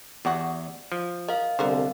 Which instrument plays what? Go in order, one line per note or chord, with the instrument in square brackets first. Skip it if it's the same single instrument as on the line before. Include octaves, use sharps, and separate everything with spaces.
[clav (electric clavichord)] E2 [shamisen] G3 F#4
[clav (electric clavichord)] F3
[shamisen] A#4 [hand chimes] D#5 F5
[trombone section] C2 [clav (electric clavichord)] D3 [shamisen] B3 A#4 C5